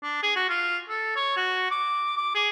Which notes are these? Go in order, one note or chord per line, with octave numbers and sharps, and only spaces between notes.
D4
G#4
F#4
F4
A4
C#5
F#4
D6
D6
G#4